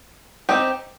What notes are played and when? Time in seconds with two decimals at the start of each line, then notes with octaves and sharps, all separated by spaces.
0.49 C4 D#4 G4